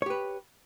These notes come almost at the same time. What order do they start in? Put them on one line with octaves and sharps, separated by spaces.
C#5 G4 B4